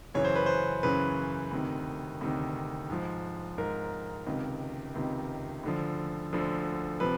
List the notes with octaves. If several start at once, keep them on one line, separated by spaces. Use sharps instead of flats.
F#2 C#3 E3 C#5
C5
B4
C5
F#2 C#3 E3 B4
D2 C3 D#3
D2 C3 D#3
G#2 F3
G#2 F3 A#4
C#2 C3 D#3
C#2 C3 D#3
D2 D3 F3
D2 D3 F3
C3 F3 B4